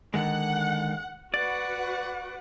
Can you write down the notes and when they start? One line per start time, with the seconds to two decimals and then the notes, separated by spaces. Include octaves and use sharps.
0.14 D3 D#3 G#3 F#5
1.34 F#4 B4 D5 F#5